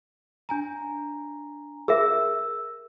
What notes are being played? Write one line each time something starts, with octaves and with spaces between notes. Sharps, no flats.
D4 G#5 A#5
G#4 A#4 E5 E6